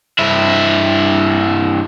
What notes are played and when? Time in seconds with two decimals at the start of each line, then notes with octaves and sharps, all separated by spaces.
0.19 G2 E4